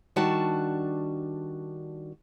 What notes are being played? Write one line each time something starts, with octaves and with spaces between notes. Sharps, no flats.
D#3 G3 D4 F#4 A5